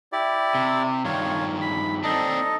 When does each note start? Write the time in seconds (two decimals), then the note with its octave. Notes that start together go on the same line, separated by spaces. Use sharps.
0.12 E4 G4 D5
0.55 C3
1.05 G2 D#3 F4 C#5
1.61 B5
2.03 C4 D4 D#4 A4 D#5